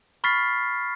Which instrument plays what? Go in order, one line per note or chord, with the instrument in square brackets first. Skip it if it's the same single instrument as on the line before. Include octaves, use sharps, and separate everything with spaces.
[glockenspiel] B5 C#6 F6 A6 B6 C7